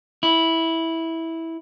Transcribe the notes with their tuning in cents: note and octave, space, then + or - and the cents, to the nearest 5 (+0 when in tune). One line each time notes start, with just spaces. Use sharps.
E4 -10